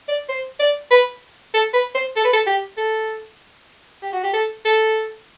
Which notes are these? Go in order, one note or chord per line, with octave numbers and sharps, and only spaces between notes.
D5
C5
D5
B4
A4
B4
C5
A4
B4
A4
G4
A4
G4
F#4
G4
A4
A4